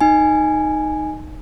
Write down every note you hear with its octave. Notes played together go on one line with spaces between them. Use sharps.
D#4 G#5